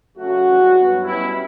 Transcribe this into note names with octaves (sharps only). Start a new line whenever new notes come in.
C#3 F#3 A3 C#4 F#4
E2 C#3 E3 G3 C#4
G2 F#3 B3
B2 G3 C#4 E4